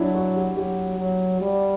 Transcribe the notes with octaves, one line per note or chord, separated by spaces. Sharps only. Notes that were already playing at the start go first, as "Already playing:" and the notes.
Already playing: F#3 D4 E4
F#4
G4
F#3 G4
F#3
G3